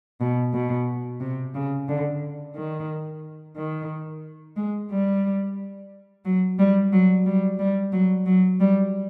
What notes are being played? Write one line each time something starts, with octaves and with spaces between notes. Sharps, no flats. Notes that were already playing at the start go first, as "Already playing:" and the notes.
B2
B2
C3
C#3
D3
D#3
D#3
G#3
G3
F#3
G3
F#3
G3
G3
F#3
F#3
G3